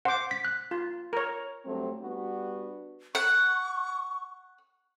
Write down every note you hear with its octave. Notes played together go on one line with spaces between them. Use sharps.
C5 F#5 D6
B6
F#6
F4
A#4 C#5
G2 F#3 A3 C4
G3 B3 D4 F#4
F#5 C#6